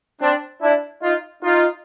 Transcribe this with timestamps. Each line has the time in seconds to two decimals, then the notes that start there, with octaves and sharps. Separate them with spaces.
0.22 C4 D4
0.62 D4 E4
1.03 D#4 F4
1.43 D#4 F4